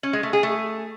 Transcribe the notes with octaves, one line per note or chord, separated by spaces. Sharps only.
C#4
G#3
A3
G#4
A3